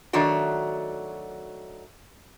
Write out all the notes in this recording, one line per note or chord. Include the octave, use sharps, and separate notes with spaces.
D#3 F#3 A3 D4 F#4